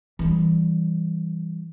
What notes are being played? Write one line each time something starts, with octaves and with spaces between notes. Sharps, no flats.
E3 G3